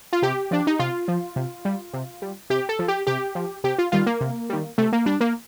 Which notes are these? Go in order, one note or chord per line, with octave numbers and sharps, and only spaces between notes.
F4
C3 G4
F3 D4
D#4
C3 F4
F3
C3
G3
C3
G3
C3 G4
A4
F3
G4
C3 G4
F3
C3 G4
F4
D#3 G3 F4
A#3
C3
D#3 G3
C3 A3
A#3
G3 D4
A#3